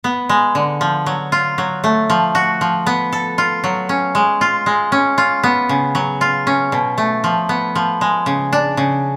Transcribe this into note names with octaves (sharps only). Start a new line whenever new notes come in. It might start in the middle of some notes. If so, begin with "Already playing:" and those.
B3
G#3
D3
F3
F#3
F4
F#3
A3
F3
F#4
F3
B3
A4
F4
F#3
C#4
G#3
F4
G#3
C#4
F4
B3
C#3
F#3
F4
C#4
B2
A3
F3
B3
F3
G#3
C#3
D4
C#3